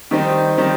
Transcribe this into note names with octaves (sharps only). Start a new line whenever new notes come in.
D#3 G3 C4 D#4
D#3 G3 C4 D#4